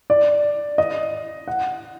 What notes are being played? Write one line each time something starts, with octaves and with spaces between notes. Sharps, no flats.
D5
D#5
F#5